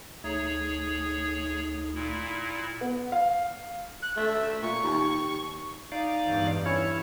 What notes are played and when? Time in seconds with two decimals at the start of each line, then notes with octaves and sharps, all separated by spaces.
0.24 D2 A3 D#4 G#4 C#5
1.94 A#2 E4
2.81 B3
3.12 F5
4.02 F#6
4.17 A3 E5
4.62 A#2 C#6
4.83 D#2
5.92 D#4 D5 F5
6.25 E2 G2
6.66 C#4 E4 C#5